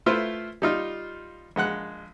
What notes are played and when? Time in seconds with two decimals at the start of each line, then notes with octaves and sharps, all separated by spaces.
0.06 A3 E4 F4 B4 C5
0.62 G3 D#4 F4
1.56 A#1 G#3 F#5 F#6